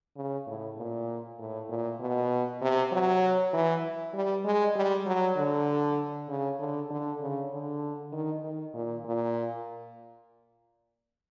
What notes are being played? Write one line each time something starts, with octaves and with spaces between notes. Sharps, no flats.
C#3
A2
A#2
A2
A#2
B2
C3
F#3
E3
G3
G#3
G3
F#3
D3
C#3
D3
D3
C#3
D3
D#3
D#3
A#2
A#2